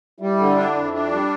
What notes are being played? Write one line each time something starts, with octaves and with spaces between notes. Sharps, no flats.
G3 E4
D3
D4
F2
D4
G3